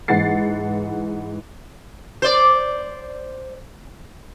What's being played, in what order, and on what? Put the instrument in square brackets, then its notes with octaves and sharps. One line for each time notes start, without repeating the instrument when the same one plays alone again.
[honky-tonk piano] G#2 E3 F#5 A6 C7
[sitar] C5 D5